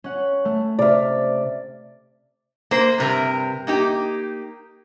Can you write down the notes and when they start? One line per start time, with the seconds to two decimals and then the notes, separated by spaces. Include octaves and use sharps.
0.04 C#4 F#5
0.45 A3
0.79 C3 D5 E5 F6
2.71 A#3 C5
2.98 G2 C3 A#4
3.67 A#3 D#4 G4